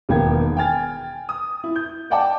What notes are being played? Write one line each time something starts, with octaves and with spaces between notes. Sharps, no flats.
E1 D#3 A#3 B3 G5 G#6
G5 G#5 F6 A6
D#6
E4
G6
D5 D#5 F#5 G5 A5 D6